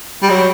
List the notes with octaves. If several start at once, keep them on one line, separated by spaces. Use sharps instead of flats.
G3
F#3